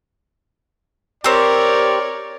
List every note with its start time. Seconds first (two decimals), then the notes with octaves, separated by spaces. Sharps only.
1.24 C4 G4 A#4 C#5 D5